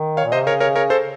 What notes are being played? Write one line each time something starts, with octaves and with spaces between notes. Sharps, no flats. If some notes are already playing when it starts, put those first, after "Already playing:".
Already playing: D#3
C#5 F5
A#2
C5 D#5
C3
C#3 A#4 C#5
A#4 C#5
A#4 C#5
A4 C5